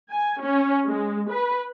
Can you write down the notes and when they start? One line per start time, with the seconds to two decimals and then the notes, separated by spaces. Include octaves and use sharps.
0.11 G#5
0.40 C#4
0.87 G#3
1.31 B4